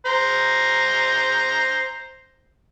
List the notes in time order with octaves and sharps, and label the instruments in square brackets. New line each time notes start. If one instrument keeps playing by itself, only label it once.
[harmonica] C5 A#5